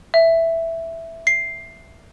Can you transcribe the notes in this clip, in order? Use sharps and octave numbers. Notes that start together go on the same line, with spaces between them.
E5
C7